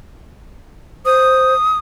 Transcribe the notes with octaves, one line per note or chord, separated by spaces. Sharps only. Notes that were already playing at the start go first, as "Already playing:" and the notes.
C5 D#6